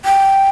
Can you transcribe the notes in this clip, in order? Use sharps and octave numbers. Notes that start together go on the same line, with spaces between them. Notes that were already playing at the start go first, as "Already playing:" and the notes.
G5